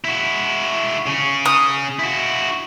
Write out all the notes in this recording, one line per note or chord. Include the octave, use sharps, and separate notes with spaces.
E4 F#4
C#3 C#4
D#6
E4 F#4